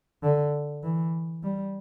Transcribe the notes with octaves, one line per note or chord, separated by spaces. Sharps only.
D3
E3
G3